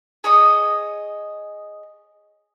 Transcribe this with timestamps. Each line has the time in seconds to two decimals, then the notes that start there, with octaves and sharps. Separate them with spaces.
0.24 G#4 C#5 D#5 D#6